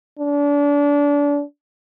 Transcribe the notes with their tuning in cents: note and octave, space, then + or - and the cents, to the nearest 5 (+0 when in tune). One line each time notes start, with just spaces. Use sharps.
D4 -30